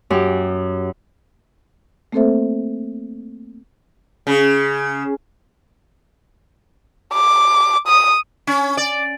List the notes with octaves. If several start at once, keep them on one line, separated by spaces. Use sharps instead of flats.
F#2 G4
A3 A#3 C4 A4 C5 E5
C#3
D6
D#6
C#4
D5